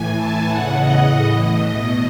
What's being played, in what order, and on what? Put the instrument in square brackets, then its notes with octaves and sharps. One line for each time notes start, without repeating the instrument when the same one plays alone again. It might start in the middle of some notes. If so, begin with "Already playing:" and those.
Already playing: [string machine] A2 E3 G#5
A5
E2 C#3 E3 F#5
D#5
A2 E3
E2 B2